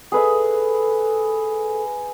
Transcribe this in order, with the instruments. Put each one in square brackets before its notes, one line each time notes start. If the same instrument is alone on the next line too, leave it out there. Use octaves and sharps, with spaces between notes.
[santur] G#4 B4 E5 [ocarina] A4